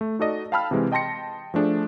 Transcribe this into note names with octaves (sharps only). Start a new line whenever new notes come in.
A3
D#4 F#4 A4 D5 D#5
F5 G5 A5 B5 E6 F6
C3 E3 G#3
D#5 G5 A5 C6 A#6 C#7
F3 A3 D4 G#4